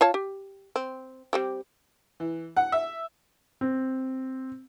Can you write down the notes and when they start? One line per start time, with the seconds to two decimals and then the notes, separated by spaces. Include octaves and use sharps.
0.01 F4 C#5 A5
0.14 G4
0.76 C4
1.33 G3 C4 G4
2.20 E3
2.57 F#5
2.72 E5
3.61 C4